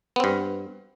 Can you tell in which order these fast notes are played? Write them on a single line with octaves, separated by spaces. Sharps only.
B3 C4 G2